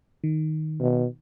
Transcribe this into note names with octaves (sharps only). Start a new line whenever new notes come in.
D#3
B2